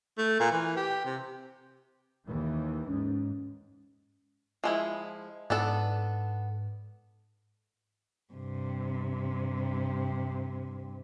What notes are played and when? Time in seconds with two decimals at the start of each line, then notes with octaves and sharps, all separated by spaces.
0.18 A3
0.40 A#2
0.52 E3
0.76 G4
1.05 C3
2.27 D#2 E3
2.88 G#2 C#4
4.64 F3 G#3 E4
5.50 G#2 B3 D4 A4
8.33 G2 C3